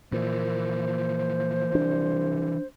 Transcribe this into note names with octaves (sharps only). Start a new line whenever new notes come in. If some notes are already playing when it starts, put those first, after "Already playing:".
A#2 E3 F3 A#3 C5
C2 D4